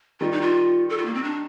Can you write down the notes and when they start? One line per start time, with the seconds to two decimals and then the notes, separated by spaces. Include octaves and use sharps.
0.20 D#3 G3 F4
0.32 D#4
0.42 F4
0.89 A4
0.98 F4
1.06 A#3
1.15 C4
1.24 D4